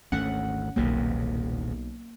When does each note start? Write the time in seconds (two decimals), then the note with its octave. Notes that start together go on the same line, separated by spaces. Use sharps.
0.12 G#1 D2 A3 C#4 F#5
0.76 D#1 B1 E2 C3 A#3